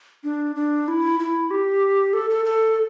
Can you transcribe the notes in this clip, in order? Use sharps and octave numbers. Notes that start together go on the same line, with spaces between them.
D4
D4
E4
E4
G4
A4
A4
A4